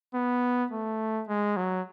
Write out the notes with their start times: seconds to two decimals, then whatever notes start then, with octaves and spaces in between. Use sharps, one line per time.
0.14 B3
0.72 A3
1.29 G#3
1.56 F#3